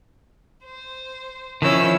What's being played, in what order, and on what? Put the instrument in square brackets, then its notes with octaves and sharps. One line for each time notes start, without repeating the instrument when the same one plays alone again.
[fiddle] C5
[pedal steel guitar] D#3 F3 E4 [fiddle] C#4 E6